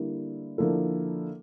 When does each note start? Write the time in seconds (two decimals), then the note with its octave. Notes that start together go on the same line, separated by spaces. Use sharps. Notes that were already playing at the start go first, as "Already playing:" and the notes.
Already playing: D3 G3 A#3 E4
0.58 D3 F3 A#3 E4 A4